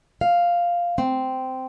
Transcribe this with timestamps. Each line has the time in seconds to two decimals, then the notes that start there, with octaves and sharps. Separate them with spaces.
0.21 F5
0.98 C4